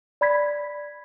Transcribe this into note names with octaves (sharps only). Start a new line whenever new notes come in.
D5 B5 G#6 B6